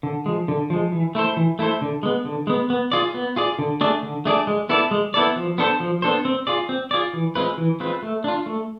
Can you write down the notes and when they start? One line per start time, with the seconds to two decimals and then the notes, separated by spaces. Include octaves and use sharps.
0.03 D3
0.26 F3 G#3
0.48 D3
0.70 F3 G#3
0.92 E3
1.15 A3 E4 A4 C5
1.37 E3
1.59 A3 E4 A4 C5
1.82 D3
2.03 G#3 B3
2.25 D3
2.47 G#3 B3
2.70 B3
2.92 F4 G#4 D5
3.14 B3
3.36 F4 G#4 D5
3.59 D3
3.81 A3 D4 G#4 D5
4.03 D3
4.25 A3 D4 G#4 D5
4.47 G#3
4.69 B3 E4 A4 D5
4.91 G#3
5.14 B3 E4 A4 D5
5.36 F3
5.58 B3 D4 A4 C5
5.80 F3
6.02 B3 D4 A4 C5
6.25 C4
6.47 F4 G#4 D5
6.69 C4
6.91 F4 G#4 D5
7.13 E3
7.35 G#3 C4 F4 B4
7.58 E3
7.80 G#3 C4 F4 B4
8.03 A3
8.24 D4 F4
8.46 A3